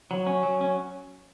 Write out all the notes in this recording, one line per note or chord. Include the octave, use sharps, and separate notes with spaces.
F#3
C#4
F#3
C#4